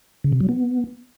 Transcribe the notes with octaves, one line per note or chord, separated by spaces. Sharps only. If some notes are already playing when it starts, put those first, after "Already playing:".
C#3
C3
F#3
B3